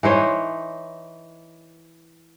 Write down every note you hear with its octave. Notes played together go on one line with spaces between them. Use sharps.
E3 D#4 C5 C#5